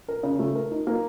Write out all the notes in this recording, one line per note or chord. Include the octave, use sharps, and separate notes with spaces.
A#4
C#3
A3
A#4
D#4
A#3